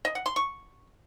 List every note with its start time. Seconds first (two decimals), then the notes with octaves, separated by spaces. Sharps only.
0.05 D#5
0.15 F#5
0.26 C6
0.36 C#6